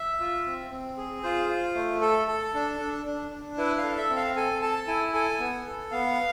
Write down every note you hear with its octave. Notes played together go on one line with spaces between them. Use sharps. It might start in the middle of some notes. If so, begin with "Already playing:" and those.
Already playing: E5
F4
C4
C4
G#4
F4 C5
F4
A3
A4
A4
D4
D4
D4
D4
E4 B4
F5
A4
E5
C4
F5
A4 G#5
A4 A5
E4 G#5
A4 G#5
B3
A4
B3 F5